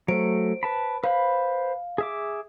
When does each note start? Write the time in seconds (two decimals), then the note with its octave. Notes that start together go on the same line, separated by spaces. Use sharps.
0.08 F#3 A3 C5 D7
0.63 B4 A5 B5
1.04 B4 C5 F5 B5
1.98 G#4 E5 D6